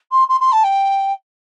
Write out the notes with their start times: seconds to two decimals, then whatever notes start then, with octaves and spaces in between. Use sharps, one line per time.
0.11 C6
0.29 C6
0.40 C6
0.52 A5
0.63 G5